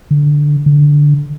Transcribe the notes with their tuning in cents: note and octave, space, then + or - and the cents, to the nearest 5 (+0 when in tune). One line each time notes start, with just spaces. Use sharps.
D3 +0
D3 -5